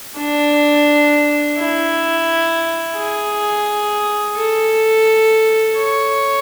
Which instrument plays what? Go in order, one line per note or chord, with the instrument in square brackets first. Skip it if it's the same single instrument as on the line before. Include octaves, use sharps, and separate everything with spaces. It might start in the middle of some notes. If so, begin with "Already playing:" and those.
[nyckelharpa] D4
E4
G#4
A4
C#5